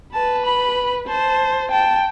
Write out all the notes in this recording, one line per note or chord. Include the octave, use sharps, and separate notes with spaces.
B4 A5
B5
C5 A5
G5 A5